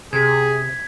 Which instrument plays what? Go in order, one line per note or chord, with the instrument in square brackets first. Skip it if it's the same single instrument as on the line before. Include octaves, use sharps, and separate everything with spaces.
[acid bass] C3 [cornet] G#4 [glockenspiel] G#6 B6